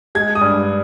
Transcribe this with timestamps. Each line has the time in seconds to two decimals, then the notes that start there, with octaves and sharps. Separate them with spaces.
0.15 G#3 G#6
0.35 D#6
0.41 G2